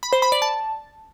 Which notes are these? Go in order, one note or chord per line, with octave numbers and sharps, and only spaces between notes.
B5
C5
B5
D5
A5